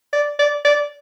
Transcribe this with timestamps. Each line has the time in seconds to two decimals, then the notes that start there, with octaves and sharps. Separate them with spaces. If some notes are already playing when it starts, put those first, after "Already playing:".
0.13 D5
0.39 D5
0.65 D5